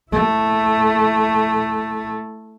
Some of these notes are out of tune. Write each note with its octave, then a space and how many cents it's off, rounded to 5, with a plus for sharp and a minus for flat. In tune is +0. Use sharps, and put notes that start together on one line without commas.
A3 +0 E4 +0